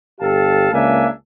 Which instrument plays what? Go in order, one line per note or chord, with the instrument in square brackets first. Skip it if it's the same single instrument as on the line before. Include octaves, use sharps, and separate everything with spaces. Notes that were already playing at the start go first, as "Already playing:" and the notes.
[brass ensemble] G1 G4 A4 F5 A5
C#2 A#3 D4 E5 G#5